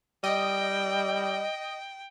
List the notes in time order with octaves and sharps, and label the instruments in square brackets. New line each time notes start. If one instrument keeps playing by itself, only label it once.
[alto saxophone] G3 [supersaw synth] D#5 [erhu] G5